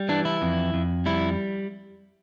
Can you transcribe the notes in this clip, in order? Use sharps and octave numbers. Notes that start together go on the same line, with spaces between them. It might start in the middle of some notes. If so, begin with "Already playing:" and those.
Already playing: G3
E3 D4
E4
F2
F2
G3 E4